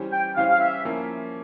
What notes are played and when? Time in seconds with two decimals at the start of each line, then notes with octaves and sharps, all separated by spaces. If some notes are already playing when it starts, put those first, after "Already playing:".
Already playing: E3 G3 C#4 G4 C5
0.13 G5
0.36 E3 G3 C#4 G4 C5 F5
0.50 F5
0.60 E5
0.85 F3 A#3 C#4 E4